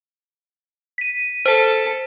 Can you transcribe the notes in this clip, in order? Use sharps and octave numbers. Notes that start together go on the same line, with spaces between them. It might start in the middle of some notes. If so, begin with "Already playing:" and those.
B6 D#7
A4 C5 B6